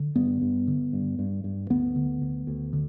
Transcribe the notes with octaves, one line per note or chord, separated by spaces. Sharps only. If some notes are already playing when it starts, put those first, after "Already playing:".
Already playing: D3
G2 B3
G2
D3
G2
G2
G2
D2 B3
D3
D2
D2
D3